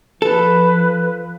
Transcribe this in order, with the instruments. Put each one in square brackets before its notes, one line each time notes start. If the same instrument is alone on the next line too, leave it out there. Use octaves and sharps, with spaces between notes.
[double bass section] F3 [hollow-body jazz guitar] A4 [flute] B4